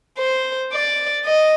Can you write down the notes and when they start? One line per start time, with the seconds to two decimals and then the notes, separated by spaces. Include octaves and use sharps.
0.18 C5
0.73 D5
1.26 D#5